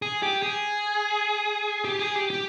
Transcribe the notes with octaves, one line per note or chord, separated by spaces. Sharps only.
G#4
G4
G#4
G4
G#4
G4
G4